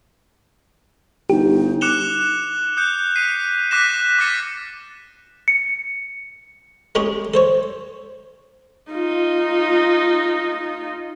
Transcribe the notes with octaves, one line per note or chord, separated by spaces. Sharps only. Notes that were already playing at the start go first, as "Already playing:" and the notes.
G1 D#4 G4
D6 F#6 C#7 E7 F7 G7
D#6 F#6 G6 C#7
B6 C7 D#7
D6 F#6 A#6 B6 D#7 E7
D6 F6 A6 B6 C#7
C#7
G#3 A3 C#4 G4 G#4
A4 C5 C#5
D#4 F4